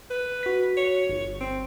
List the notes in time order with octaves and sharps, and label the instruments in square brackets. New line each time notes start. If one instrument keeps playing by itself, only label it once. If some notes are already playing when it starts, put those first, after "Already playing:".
[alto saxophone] B4
[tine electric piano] F#4 B6
[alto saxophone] C#5
[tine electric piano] G1
[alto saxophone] C4